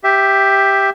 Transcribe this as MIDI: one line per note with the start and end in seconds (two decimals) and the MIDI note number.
0.04 0.90 67
0.04 0.90 76